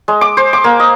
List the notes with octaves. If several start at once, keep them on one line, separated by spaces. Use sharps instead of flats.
G#3
D6
C5
D6
A#3
D#5